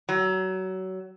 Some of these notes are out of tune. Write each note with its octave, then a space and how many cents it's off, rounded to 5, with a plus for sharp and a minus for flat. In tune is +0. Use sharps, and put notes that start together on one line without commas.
F#3 +25